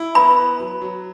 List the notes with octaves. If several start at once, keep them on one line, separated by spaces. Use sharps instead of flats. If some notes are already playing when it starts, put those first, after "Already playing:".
Already playing: E4
B3 B5
B4
F#3
F#3